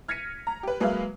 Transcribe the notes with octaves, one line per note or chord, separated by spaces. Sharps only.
F6 G#6 A#6 B6 C#7 D#7
A#5
G4 B4
F#3 G#3 A#3 B4 E5 F5